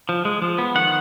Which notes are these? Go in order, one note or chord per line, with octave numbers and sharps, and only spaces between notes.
F3
G#3
F3
B3
D#3 F#5